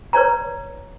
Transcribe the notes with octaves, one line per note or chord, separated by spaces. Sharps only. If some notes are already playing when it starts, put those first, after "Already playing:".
B4 C#5 D5 A#5